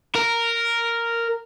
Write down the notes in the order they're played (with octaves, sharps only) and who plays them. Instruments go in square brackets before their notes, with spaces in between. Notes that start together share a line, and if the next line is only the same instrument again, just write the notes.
[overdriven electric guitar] A#4